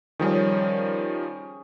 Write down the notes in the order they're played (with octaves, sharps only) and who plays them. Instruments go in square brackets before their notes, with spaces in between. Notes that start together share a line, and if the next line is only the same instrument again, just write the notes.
[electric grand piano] D#3 F3 G3 [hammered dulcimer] C#4 G#4